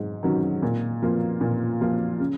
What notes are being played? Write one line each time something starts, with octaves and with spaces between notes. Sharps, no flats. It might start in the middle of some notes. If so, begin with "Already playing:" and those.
Already playing: G#2 F#3
D#3 F#3 C#4
A#2
F3 A#3 F4
A#2
F3 A#3 F4
C#3